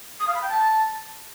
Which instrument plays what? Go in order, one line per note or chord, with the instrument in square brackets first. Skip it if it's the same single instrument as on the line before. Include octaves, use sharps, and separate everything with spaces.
[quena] D#6
F5
B5
G5
A5